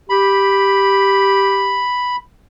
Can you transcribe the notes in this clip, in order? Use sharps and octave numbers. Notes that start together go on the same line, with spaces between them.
G4 B5